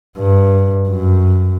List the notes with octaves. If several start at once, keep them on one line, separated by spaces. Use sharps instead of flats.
G2
F#2